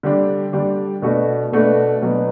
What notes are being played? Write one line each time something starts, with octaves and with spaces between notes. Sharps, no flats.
D3 G3 D4
D3 G3 D4
B2 A3 D4 F#4 B4
B2 A3 D4 F#4 B4
B2 F#3 B3 D4